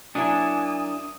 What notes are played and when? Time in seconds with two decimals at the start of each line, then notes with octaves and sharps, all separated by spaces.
0.15 F#3 A#3 D4 E4 G#5 D#6